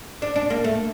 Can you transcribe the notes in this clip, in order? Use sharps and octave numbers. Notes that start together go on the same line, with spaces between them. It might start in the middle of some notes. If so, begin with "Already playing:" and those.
D4
D4
A#3
A3